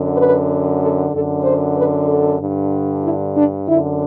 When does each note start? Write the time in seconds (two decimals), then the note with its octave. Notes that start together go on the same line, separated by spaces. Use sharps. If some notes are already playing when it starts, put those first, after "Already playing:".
Already playing: F#2 D3
0.17 B4
0.82 A4
1.13 F#2 D3 A4
1.44 C5
1.77 B4
2.08 A4
2.40 G2 D3
3.04 E4
3.36 D4
3.68 F#2 D3 E4